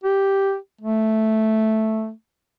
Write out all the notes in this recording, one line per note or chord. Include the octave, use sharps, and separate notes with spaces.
G4
A3